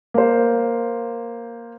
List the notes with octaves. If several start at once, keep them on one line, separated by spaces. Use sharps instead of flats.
A#3 C5